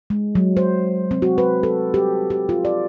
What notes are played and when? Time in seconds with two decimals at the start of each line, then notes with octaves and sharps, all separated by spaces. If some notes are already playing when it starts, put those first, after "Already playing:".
0.10 G#3
0.35 F#3
0.57 C5
1.11 C4
1.22 F#4
1.38 B4
1.63 A4
1.94 G4
2.30 G4
2.49 F4
2.65 D5